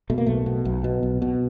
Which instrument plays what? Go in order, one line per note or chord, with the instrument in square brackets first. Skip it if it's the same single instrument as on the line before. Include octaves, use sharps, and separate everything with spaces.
[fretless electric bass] B2 A3
A#3
B1 A3
B2
B1
B2
B1
B2